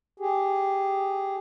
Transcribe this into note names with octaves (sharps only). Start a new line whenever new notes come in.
G4 G#4